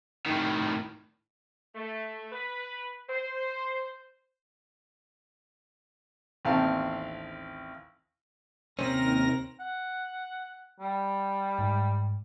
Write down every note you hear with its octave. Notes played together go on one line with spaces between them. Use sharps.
A2 D#3
A3
B4
C5
A1 D#2 C4 F5 A5 C#6
D#2 C3 C4 C#4 A#4 A#6
F#5
G3
G#2